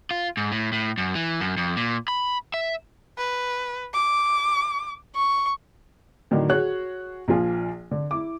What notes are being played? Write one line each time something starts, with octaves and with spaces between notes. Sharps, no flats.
F4
G#2
A2
A2
F#2
E3
F#2
F2
A#2
B5
E5
B4
D6
C#6
A2 D3 D#3 F#3
F#4 G#4 C#5 F#6
A#1 A#2 F3 F4 G#5
D3
E4 D6